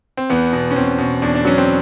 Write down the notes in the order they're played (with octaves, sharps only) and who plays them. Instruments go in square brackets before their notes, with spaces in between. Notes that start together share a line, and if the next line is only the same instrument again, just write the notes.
[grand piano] C4
E2 B3
B2
C#4
E2 C4
B2
E2 D4
D4
F#3 C#4
C4